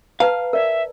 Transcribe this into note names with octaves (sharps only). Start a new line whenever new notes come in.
B4 F5 A5 A#5
A#4 D5 E5